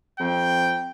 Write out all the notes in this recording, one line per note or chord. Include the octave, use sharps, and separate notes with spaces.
F2 G5